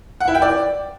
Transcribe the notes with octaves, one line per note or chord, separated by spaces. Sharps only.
F#5
E4
G5
D5